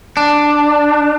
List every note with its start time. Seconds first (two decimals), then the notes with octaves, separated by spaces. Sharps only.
0.17 D4